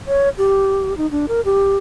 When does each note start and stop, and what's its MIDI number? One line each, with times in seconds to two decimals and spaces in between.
0.07 0.29 73
0.38 0.96 67
0.97 1.10 63
1.11 1.26 62
1.28 1.41 70
1.45 1.78 67